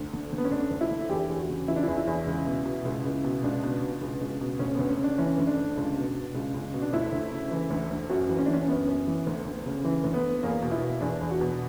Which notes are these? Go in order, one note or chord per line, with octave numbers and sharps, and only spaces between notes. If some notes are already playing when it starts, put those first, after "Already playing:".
Already playing: D2
D3
D3
B3
C#4
D2 D4
D2
E4
D3
E2 G4
E2
F#4
C#3
E3 E4
D4
E2 E4
E4
E2
C#2
B2
B2
C#2
C#2
B2
C#2 D4
B2
B2
C#2
C#2
B2
D2 C#4
D2 B3
C#4
C#3 D4
E3 C#4
D2
D4
D2
C#2
B2
B2
C#2
C#2
B2
D4
D2 E4
D2
C#3
E3
D2
D2
F#2 F#4
E3
C#4
E3 D4
C#4
F#2 B3
F#2
E3
D2
D2
C#3
E3
D2
B3
D2
E2 A#3
B2
E4
B2
E2 D4
E2
F#4
B2